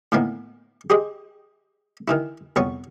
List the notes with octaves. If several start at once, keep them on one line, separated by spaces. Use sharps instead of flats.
A2 D#3 E3 A#3 B3
G4 G#4 C5 D#5
D#3 E3 E4
C2 F2 B3 C#5 C#6